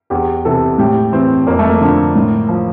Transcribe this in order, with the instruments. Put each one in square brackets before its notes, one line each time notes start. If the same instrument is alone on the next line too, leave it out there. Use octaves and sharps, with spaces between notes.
[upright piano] E2 G4
C3 E3 A4
A2 G4
E3 C4
F2 A#3
A3
A#3
D3 F3
A2
F3